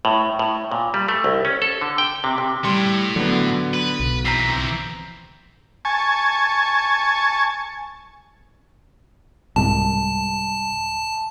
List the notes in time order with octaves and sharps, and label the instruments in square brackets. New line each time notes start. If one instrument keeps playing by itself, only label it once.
[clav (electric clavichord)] A2
A2
A#2
G3
A3
C2
C#4
A4
D3
G5
C3
C3
[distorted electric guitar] A2 [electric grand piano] G3 C6
[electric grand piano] D3 B3 [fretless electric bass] F#3
[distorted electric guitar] B4
[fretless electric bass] B1
[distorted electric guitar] E3 C4 [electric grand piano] A#5 B6 C7
[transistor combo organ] G#5 A5 C#6
[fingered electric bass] C2 G#2 [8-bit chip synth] A5